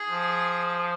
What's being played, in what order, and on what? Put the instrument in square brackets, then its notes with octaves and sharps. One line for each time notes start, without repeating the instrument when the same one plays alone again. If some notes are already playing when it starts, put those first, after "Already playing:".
Already playing: [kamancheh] G#4
[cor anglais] F3